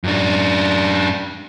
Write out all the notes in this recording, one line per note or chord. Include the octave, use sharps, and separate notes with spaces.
F#2 D4